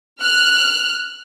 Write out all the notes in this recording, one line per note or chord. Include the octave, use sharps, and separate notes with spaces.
F6 F#6